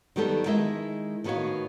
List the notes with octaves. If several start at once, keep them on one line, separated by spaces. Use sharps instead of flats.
D#3 F#3 G3 B3 G4 A4
D#3 G#3 E4 G#4 D#5 E5
A2 D#3 B3 F#4 C#5 F5